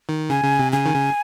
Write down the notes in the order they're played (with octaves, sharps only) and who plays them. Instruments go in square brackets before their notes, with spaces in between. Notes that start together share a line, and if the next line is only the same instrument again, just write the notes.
[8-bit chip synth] D#3
[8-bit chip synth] C#3 [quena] G#5
[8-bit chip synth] C#3
C3
[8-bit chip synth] C#3 [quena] G#5
[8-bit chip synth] D#3
C#3